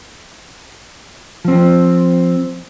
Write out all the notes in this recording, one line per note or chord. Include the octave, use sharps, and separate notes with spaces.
F3 C4